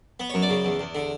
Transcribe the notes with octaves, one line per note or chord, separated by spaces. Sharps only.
B3
F#2 C#5
D5
C#3
E2
E2
D3